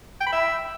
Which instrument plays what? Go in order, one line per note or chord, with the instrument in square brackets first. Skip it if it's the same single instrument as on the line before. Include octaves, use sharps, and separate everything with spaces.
[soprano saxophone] G5
B5
E5